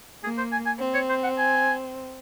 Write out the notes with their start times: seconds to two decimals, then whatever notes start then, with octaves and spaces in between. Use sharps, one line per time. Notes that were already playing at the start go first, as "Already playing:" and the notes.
0.24 A#3 G#4
0.38 C5
0.52 G#5
0.66 G#5
0.80 C4
0.94 C#5
1.09 C5
1.23 F#5
1.38 G#5